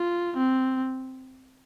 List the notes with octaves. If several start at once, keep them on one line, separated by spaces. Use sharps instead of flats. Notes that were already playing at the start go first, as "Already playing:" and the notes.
Already playing: F4
C4